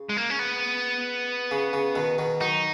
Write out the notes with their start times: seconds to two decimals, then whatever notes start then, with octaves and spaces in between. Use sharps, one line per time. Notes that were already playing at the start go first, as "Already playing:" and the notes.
Already playing: C#3
0.09 G#3
0.17 A#3
0.30 C#4
0.39 B3
1.51 C#3
1.73 C#3
1.95 B2 D#3
2.18 B2 D#3
2.40 D#3 F#3 D#4